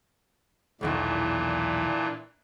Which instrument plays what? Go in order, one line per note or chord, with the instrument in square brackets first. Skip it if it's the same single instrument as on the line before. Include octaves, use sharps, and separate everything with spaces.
[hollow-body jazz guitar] B1 E2 D#3 [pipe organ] A#2 E3 D4